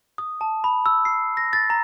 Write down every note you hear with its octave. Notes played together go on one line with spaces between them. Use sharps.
D#6
A5
B5
E6
C7
A#6
A6
A#5